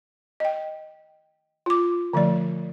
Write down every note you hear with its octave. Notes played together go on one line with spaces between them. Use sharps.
D#5 G5
F4 D6
D3 F3 A3 D5